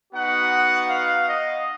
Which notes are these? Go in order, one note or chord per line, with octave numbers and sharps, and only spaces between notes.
B3 D#4 F#4 F#5
F5
D#5